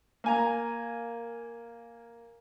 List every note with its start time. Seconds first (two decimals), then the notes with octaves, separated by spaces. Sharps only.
0.24 A#3 G#5 A#5